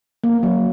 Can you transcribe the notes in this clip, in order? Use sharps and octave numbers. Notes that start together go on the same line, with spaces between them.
A#3
F#3